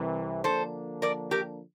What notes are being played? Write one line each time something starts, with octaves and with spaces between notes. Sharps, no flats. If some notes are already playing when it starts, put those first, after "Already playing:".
Already playing: C2 C3 E3
D3 F3 A#3 D4 A4 C5
A#4 D5
G4 A#4